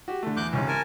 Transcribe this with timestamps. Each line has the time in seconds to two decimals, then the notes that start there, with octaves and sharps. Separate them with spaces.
0.08 F#4 G4
0.23 D3 A3
0.37 E2 D6 F#6 G6
0.53 C#2 G#2 C3 C#4
0.68 A#4 G#5 A5